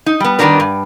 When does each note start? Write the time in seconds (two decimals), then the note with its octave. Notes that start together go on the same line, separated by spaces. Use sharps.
0.06 D#4
0.20 G3 B3
0.39 D#3 G3 G#3 B3 D4 A#4
0.60 G2